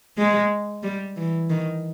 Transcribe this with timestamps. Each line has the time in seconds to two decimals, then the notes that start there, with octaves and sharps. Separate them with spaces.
0.17 G#3
0.83 G3
1.16 E3
1.50 D#3